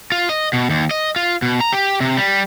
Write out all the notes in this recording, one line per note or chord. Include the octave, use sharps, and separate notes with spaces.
F4
D#5
B2
D#2
D#5
F4
B2
A#5
G4
C3
G3